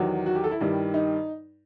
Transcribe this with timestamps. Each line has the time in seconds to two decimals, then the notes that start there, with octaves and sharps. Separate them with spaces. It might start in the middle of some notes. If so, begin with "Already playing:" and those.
Already playing: E2 D#3 F#3 G4
0.26 F#4
0.35 G4
0.44 A4
0.51 E4
0.61 G2 D#3 G3
0.94 D#4